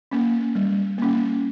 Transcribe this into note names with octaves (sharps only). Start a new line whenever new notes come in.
A#3 C#4
G3
A#3 C#4